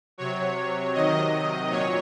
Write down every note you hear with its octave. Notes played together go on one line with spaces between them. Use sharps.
C3 F#3 C#5
C3 D#3 F#3 D#5
A#2 F#3 C#5